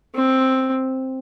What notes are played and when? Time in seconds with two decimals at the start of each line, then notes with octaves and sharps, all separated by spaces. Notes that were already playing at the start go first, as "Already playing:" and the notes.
0.15 C4